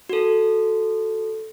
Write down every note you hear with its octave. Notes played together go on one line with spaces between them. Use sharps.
F#4 A4